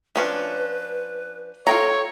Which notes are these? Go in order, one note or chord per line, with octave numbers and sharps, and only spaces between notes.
F3 C#4 D4 B4
F4 A4 C#5 G5 A#5